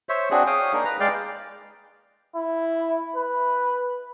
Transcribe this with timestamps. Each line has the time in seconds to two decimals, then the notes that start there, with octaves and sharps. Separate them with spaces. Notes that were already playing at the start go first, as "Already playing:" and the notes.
0.09 C5 C#5 E5
0.31 C4 D4 F#4 G#4
0.47 C#5 F5 G5 D#6
0.73 A#3 D4 D#4 G#4
0.85 B4 A#5
1.00 G#3 D5 F5 G5
2.36 E4
3.16 B4